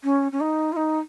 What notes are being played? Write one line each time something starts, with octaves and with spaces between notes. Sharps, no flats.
C#4
C#4
D#4
F4
D#4